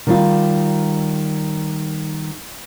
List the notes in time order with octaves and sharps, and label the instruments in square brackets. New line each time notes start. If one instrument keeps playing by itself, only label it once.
[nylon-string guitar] D#3 G3 F4